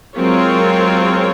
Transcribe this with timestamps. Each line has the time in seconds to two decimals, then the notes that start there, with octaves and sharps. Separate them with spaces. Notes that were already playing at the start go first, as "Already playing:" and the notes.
0.16 F#3 G#3 C4 F4 A#4 C#5
0.52 F#3